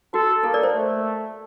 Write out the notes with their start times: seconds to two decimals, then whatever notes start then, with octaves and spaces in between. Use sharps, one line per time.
0.14 F#4 A4
0.44 A#3 A4
0.54 A#4 D5
0.63 C5
0.74 A3